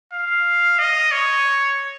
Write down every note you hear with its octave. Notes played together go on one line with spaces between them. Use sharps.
F5
D#5
C#5